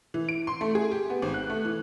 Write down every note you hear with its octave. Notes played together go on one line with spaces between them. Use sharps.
E3
D7
C6
A3
G#4
G4
B3
G#1
F#6
A3
E3